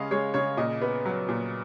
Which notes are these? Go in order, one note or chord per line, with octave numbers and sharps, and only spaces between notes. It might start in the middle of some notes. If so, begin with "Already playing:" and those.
Already playing: C#3 G#3 D#5 F5
G#3 C#5
C#3 C#5
A#2 D#5
B3
F#3
A#2